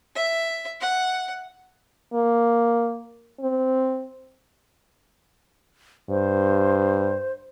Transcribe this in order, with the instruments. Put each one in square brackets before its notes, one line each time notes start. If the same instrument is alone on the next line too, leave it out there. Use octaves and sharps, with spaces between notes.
[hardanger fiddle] E5
F#5
[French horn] A#3
C4
[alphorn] G2 [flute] C5